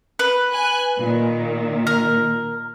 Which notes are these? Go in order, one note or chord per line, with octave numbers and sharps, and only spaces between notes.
B4
G#5 F#6
A#2 D#3
A#4